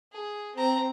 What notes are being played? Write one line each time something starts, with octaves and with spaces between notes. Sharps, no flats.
G#4
C4 A#5